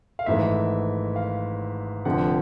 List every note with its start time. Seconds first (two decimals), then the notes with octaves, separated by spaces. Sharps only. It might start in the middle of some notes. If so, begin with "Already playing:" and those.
0.19 F5
0.26 G#1 G#2 E3 A3 E5
1.16 F5
2.05 F1 F2 D3 F3 F#5